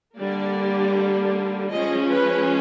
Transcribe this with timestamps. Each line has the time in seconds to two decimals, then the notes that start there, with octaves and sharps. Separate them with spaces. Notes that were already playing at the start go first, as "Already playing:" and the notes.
0.16 D3 G3 A#3 D5
1.70 F3 G#3 C#4 D#5
2.09 B4